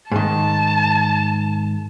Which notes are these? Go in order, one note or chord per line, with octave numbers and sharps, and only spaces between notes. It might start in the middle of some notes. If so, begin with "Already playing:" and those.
G#2 D#3 A5